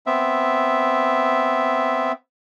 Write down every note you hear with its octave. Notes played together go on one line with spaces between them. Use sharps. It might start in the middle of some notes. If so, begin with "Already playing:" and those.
B3 C4 E5